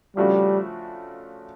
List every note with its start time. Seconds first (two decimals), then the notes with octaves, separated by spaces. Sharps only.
0.17 C#3 F3 G3 A3 D4 F#4